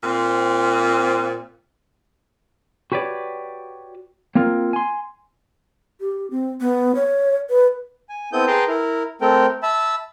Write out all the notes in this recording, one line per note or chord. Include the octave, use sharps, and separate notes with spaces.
A#2 C4
F#4 G4 B4 C#5 D5
A#3 C4 F4 A#4
G#5 C6
G4
C4
B3
C#5
B4
G#5
B3 C4 E4 A4 D#6 G6
G#4 B4 G5 A5 A#5 C6
E4 A#4
A3 C4 A4 A#4 G5
E5 A5 B5 E6